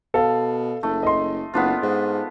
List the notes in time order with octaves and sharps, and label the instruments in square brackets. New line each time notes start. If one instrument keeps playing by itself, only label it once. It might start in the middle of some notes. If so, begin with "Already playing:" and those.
[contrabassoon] B2 [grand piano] A4 F5
[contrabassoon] F#1 [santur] A3
[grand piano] D#5 C6
[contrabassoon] F#1 [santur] B3 D4 F4
[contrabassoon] G#2